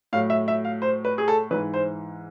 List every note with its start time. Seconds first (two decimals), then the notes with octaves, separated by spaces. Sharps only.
0.13 A2 F5
0.15 F#3
0.30 E5
0.48 E5
0.65 F5
0.82 C5
1.05 B4
1.18 G#4
1.28 A4
1.51 G#2 E3 B4
1.74 C5